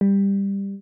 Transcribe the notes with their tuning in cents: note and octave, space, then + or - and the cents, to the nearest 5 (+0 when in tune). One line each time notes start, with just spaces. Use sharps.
G3 +15